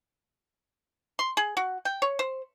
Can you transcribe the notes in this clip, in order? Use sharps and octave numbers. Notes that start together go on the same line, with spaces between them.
C6
G#4
F#4
G5
C#5
C5